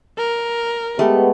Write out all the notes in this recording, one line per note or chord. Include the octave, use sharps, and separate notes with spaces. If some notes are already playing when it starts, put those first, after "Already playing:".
A#4
G#3 A3 B3 G4